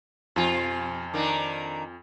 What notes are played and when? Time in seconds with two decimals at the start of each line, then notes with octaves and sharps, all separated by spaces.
0.36 F2 B2 F3 F4 G#5
1.14 D#3 A#3 D4